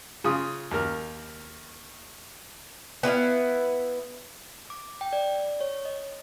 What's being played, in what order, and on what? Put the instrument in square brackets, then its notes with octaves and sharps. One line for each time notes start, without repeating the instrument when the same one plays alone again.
[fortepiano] C#3 F4 D#6
D#2 A#4
[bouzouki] B3 E4 G4 F5
[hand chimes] D6
G5
D5
C#5
D#5